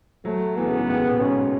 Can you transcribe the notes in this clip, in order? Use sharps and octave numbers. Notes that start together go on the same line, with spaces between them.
F#3 A3
E3 B3
C#3
G#2
A2
C#3
B2
G#2 C#4